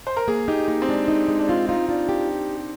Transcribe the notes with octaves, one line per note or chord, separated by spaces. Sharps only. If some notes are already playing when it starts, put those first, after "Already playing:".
C5
A#4
A#3 G#4
D#4 G4
A#3 D#4
C4
G#3 D4
D#4
G#3
D4
C4 F4
D#4 F4
D4 F4
G4